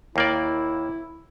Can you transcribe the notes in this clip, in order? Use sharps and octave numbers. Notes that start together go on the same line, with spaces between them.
D#2 A#3 E4 D5